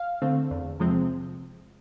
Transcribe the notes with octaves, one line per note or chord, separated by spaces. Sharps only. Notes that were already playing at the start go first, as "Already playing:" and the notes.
Already playing: F5
D3 A3 C4
E2
C3 F3 G#3 C4